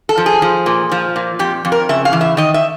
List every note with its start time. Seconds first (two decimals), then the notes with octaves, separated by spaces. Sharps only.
0.09 A4
0.17 F3
0.26 G#4
0.42 F3
0.66 A#2
0.92 F3
1.16 A#2
1.39 F2 G4
1.65 F2
1.72 A#4
1.89 C#3 E5
2.05 F5
2.13 E3
2.21 E5
2.37 D#3 D#5
2.54 E5